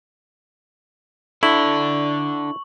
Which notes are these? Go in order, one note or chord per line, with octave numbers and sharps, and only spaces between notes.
D4 E4 A4 C#6 F#7